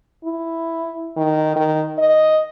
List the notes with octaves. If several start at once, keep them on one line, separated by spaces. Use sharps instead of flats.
E4
D#3
D#3
D#5